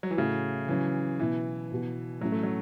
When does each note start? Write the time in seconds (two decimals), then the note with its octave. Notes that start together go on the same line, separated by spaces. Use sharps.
0.03 F#3
0.11 E3
0.17 A2 C#3 A3 F#4
0.68 C#3 E3 F#3 C#4
1.19 B2 E3 B3 E4
1.71 B2 B3 F#4
2.21 A2 E3 F#3 C#4 F#4
2.32 A3
2.43 F#3